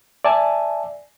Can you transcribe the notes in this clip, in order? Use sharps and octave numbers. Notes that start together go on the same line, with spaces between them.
D5 E5 G#5 A5